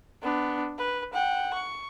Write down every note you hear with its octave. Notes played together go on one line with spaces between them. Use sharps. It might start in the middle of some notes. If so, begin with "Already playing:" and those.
B3 D4
B4
F#5 G5
C#6